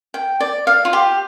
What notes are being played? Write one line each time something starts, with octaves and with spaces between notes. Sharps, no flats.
G5
D5
F5
F4
G4